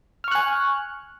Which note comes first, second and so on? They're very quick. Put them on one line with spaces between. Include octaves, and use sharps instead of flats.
F6 C#6 F#6 G#5